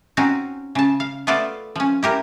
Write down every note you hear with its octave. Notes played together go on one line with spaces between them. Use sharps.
C4 C#4 D#4 F#4 A#5
C#3 A5
F5
A3 B3 F4 A4 D5
F3 C#4
E4 G4 A#4